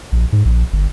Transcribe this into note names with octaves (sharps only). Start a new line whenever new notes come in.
A#1
G#2
A#1
G1